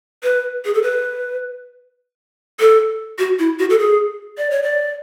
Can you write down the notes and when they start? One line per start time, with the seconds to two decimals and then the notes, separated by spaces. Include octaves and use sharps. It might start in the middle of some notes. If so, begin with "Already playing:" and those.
0.23 B4
0.65 G#4
0.74 A4
0.83 B4
2.60 A4
3.19 F#4
3.39 E4
3.59 F#4
3.70 A4
3.79 G#4
4.38 D5
4.50 C#5
4.63 D5